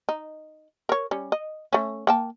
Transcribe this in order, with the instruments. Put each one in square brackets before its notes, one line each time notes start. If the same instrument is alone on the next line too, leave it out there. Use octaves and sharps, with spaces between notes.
[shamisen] D#4
A#4 C#5
G3 C#4
D#5
A3 C#4
A#3 G5 A5